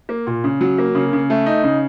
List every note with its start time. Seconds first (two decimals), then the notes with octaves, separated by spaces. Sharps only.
0.09 A#3
0.27 A#2
0.44 C#3
0.61 F#3
0.78 A#3
0.95 C#3
1.13 C#3
1.30 A3
1.46 D#4
1.63 C#3